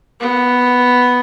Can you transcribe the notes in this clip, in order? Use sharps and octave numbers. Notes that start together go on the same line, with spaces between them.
B3